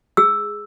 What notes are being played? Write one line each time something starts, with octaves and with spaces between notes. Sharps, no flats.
G#4 E6